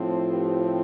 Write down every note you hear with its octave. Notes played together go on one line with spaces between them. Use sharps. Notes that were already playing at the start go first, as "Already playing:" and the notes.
Already playing: A2 F3 C4
G4 B4